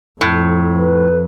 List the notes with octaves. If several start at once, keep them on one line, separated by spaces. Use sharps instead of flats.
F2 A2
B4